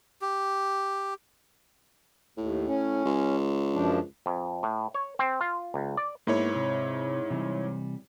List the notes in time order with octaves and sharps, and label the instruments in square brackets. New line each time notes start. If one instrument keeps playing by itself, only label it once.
[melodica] G4
[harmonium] D#2 [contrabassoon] A2
[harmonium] C#4
[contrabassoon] C#2
[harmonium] F#2 F3 D4
[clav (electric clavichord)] F2
A2
C#5
C4
F4
C#2
D5
[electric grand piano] G#2 E4 C#5 [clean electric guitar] A#3 B3
[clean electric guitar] C3
C3 E3 G3